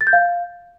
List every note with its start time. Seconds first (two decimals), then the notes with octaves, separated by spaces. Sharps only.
0.01 A6
0.07 G6
0.13 F5